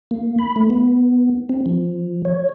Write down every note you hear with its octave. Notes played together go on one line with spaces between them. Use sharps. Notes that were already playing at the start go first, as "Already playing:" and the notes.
A#3
B5
A3
B3
C4
F3
C#5